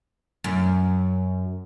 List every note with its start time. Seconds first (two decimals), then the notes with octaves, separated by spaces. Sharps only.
0.44 F#2